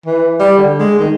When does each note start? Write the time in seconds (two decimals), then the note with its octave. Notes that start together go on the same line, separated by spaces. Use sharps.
0.06 E3
0.40 G3
0.58 D3
0.80 G#3
0.99 D#3